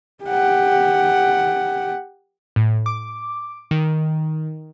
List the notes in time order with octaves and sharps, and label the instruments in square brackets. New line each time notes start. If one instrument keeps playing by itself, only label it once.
[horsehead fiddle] G4 F#5
[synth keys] A2
D6
D#3